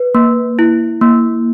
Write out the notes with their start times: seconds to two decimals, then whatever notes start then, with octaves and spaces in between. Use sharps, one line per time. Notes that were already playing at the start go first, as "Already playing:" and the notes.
Already playing: B4
0.15 A#3
0.59 E4
1.01 A#3